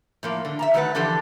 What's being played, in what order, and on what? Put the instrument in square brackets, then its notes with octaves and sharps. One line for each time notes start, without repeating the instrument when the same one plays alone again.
[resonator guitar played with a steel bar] A2 F3 A#3
D3
E5 A5 A#5
D#3 F#3 A3 A4 B4 F#5
D3 E3 F3 D4 G4 A4